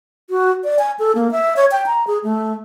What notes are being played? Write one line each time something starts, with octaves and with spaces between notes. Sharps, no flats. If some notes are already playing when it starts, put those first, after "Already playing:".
F#4
D5
G#5
A4
A#3
E5
C#5
G5
A#5
G#4
A3